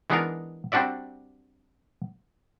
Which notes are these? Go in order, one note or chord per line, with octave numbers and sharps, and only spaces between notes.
E3 G#3 B3 D4 D#4 A#4
G3 C4 D4 F#4 D5 E5